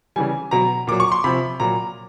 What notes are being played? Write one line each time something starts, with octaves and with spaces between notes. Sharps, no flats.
C#3 E3 G3 G#5
B2 F#3 A#5
A#2 F#3 D6
C#6
C6
C3 F3 B5
A#2 F#3 A#5